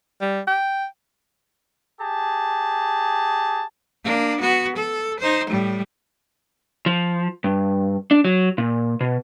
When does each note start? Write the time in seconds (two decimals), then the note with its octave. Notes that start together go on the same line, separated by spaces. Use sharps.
0.21 G3
0.47 G5
2.00 G4 G#4 A5
4.04 A#3 D4
4.40 B3 F#4
4.76 A4
5.20 D#4 C5
5.50 A2 G3
6.86 F3
7.44 G2
8.11 D4
8.25 F#3
8.58 A#2
9.01 B2